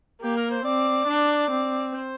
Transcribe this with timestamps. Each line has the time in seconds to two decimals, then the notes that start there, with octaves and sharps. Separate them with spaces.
0.21 A#3 G4
0.36 A#4
0.50 C5
0.64 C4 D5
1.07 D4
1.50 C4
1.93 C5